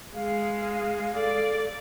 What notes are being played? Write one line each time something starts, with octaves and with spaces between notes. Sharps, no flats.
G#3 G#4 F5
A4 D5